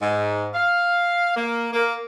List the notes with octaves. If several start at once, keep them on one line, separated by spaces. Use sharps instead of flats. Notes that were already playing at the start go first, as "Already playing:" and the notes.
G#2
F5
A#3
A#3